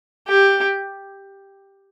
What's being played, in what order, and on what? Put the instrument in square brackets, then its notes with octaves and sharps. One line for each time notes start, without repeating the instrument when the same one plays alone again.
[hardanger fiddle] G4